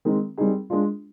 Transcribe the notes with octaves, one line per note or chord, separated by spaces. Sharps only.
D#3 G#3 C4 D#4
G3 C4 D#4 G#4
G#3 D4 F4